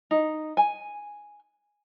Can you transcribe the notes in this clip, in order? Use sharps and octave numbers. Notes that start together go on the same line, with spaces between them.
D#4
G#5